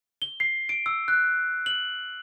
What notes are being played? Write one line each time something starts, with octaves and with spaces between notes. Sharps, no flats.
G7
C7
D7
E6
F#6
F#7